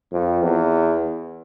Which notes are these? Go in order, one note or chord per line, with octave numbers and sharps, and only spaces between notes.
F2
E2